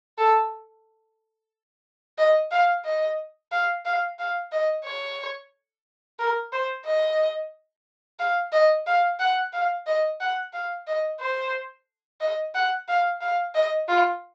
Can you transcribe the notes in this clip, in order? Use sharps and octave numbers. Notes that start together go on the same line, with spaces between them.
A4
D#5
F5
D#5
F5
F5
F5
D#5
C#5
A#4
C5
D#5
F5
D#5
F5
F#5
F5
D#5
F#5
F5
D#5
C5
D#5
F#5
F5
F5
D#5
F4